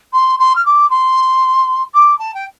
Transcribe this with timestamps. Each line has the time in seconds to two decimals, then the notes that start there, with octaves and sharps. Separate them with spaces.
0.13 C6
0.39 C6
0.55 F6
0.65 D6
0.90 C6
1.94 D6
2.19 A5
2.34 G5